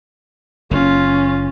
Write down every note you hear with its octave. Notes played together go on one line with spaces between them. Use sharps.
F#1 C#4 F4